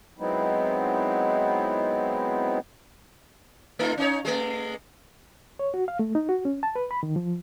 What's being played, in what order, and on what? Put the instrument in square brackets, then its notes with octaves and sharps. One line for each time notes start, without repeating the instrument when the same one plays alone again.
[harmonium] F#3 G#3 B3 C4 D#4 E4
[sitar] A3 D#4 F4
C#4 D#4 C#5
G#3 A3
[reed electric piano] C#5
F#4
F5
A3
D#4
F#4
C#4
A5
B4
B5
D#3
F3